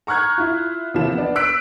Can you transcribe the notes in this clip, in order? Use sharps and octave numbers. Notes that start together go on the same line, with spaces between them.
A#5 C#6 F6 F#6 G#6
E4 F4
D#2 C3 F3 E4 E7
B3 D4
E6 F#6 B6 D7